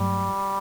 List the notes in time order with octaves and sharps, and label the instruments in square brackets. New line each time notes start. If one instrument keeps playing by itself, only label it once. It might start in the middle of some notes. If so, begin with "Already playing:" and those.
Already playing: [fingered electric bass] G2 F#3 A3 [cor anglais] G3